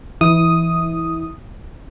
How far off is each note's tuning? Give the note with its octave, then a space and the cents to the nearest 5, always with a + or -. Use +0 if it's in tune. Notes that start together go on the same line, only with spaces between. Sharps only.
E3 +20 E4 -25 D#6 +0